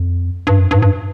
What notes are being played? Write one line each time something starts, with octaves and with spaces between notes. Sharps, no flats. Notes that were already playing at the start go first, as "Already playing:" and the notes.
Already playing: F2
G2
F#2
G2
G#2
G2